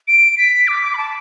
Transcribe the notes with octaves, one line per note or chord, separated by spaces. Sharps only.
D7
B6
D6
D6
B5
A5